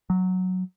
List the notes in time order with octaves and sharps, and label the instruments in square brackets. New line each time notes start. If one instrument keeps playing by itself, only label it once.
[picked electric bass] F#3